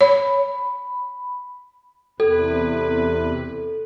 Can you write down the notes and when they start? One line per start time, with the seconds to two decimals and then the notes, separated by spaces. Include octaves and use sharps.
0.01 C#5 B5
2.20 E2 C3 A4 B4